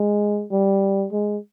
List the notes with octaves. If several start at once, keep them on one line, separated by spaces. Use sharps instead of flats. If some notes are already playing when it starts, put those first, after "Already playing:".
Already playing: G#3
G3
G#3